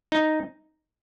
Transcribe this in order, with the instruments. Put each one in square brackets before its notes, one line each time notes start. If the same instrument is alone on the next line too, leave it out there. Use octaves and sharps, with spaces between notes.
[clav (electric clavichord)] D#4